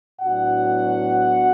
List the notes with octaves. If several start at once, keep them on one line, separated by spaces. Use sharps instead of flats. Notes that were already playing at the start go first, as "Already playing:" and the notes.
A2 F#3 B3 D4 F#4 F#5